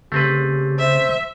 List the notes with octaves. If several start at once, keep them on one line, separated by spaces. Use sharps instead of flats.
C#3 A3 C4 G4 B4
C5 E5